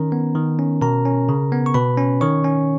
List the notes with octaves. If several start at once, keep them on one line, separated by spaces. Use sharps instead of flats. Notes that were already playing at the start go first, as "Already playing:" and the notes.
Already playing: D#3 C#4 A#4 A#5
B3
D#3
C#4
B2 A#4 A#5
C#4
C#3
B3
C#6
B2 B4 B5
C#4
D#3 C#5 C#6
C#4